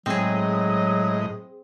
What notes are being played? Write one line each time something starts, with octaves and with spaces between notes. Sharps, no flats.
A2 F#3 G#3 C4 G#4 D#5